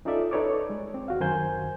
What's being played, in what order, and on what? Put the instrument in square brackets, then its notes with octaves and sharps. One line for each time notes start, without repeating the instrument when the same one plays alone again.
[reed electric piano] C#4 D#4 F4 A4 D5 E5
D#4 A4 B4 C#5 D5 D6
G#3
C4
D#2 F#4 F5
F#2 D#3 A#4 C5 G#5 G6